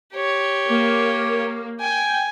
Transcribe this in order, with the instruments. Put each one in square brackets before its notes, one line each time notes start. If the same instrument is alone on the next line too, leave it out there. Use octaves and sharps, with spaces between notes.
[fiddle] G4 C#5
[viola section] A#3
[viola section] G5 [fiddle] G#5